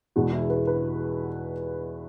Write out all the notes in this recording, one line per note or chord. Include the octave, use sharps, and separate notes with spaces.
E2 B2 G#3 F#4
E4
B4
B4